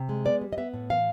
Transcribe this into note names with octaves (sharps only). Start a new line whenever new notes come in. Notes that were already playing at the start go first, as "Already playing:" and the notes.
Already playing: C3
G#3
B3 D5
G3
D#5
B3 E5
A2
E3 F5